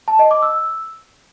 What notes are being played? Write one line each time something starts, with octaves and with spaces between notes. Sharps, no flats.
A5
D#5
D6
E6